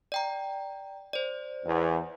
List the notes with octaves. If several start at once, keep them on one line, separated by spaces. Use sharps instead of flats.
D5 G5 A#5
C5 D5
E2